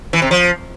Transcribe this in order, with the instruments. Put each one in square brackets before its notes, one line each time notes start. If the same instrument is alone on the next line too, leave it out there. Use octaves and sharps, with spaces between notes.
[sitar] E3
C3
F3